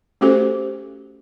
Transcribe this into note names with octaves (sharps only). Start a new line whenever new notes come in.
A3 C#4 F#4 G4 A4 C5